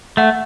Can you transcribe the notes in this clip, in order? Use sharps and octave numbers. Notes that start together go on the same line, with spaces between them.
A3 F#5